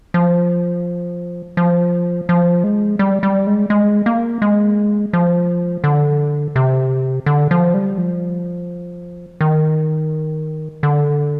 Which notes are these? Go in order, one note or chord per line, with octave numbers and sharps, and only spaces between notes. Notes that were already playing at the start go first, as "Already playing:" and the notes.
F3
F3
F3
G#3
G3
G3
G#3
G#3
A#3
G#3
F3
D3
C3
D3
F3
G3
F3
D#3
D3